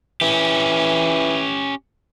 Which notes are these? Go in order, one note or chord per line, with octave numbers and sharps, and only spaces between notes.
E3 C#4 G4